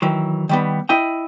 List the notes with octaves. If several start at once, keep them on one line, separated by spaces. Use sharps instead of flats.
D#3 E3 F#3
D#3 G3 B3
E4 D#5 G5